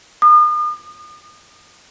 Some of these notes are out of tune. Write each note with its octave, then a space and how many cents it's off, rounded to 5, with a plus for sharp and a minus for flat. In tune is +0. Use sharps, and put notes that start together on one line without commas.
D#6 -40